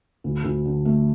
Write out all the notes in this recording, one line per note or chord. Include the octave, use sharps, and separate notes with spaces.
D2
D2
D3
A3